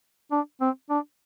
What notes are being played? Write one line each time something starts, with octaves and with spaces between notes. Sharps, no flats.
D4
C4
D4